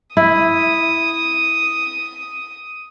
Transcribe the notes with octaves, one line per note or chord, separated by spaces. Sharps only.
E4 D#6